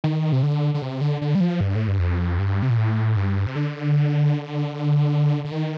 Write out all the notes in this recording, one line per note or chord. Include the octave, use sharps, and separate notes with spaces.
D#3
C3
D3
D3
C3
D3
D3
G3
F3
G2
A2
G2
F2
G2
C3
A#2
A2
G2
C3
D3
D3
D#3